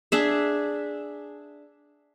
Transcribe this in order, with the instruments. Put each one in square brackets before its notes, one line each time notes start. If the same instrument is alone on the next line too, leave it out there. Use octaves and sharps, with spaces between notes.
[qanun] D4 G#4 E5